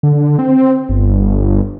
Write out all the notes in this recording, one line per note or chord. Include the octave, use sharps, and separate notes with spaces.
D3
C4
G1